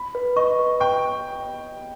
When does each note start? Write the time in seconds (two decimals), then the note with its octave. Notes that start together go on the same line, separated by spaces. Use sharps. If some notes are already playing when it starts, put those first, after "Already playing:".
Already playing: B5
0.15 B4
0.36 D#5 C#6
0.59 B4
0.80 G5 C#6